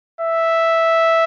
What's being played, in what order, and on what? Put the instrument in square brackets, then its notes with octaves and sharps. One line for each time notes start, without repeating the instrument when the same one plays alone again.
[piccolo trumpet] E5